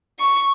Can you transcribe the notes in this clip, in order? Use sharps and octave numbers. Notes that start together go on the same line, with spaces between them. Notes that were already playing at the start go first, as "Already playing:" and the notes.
C#6